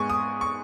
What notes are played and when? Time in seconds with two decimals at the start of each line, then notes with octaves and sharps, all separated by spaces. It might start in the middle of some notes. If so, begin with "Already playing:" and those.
Already playing: G#2 G#3 B3 G#5 C#6
0.10 D#6
0.41 C#6